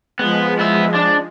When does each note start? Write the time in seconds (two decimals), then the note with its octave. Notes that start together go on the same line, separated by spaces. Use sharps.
0.19 F3 G#3 B3
0.59 B3 E5
0.95 D4